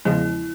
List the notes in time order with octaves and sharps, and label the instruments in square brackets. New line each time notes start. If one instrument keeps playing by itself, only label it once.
[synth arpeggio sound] E2 C#3 F3 G#3 [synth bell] E4